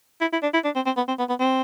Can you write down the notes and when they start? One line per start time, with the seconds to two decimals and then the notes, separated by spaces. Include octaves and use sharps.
0.21 E4
0.33 E4
0.43 D4
0.54 E4
0.65 D4
0.76 C4
0.86 C4
0.97 B3
1.08 C4
1.19 B3
1.29 B3
1.40 C4